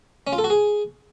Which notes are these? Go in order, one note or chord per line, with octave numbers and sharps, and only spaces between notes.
C#4
F4
A4
F#4
G#4